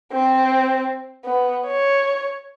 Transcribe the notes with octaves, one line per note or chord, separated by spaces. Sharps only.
C4
B3
C#5